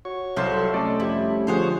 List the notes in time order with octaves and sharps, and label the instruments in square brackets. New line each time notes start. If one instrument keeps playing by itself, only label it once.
[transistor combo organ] F#4 C#5 C#6
[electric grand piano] C2 F#3 [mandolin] F4 A4 C5
[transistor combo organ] G3 A3 C#4 [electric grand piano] D5 D#5 A5
[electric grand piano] F2 G4 [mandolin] E4
[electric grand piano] D3 F3 G#4 [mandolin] C5 C#5 F#5